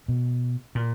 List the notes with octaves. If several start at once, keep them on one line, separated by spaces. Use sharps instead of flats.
B2
A#2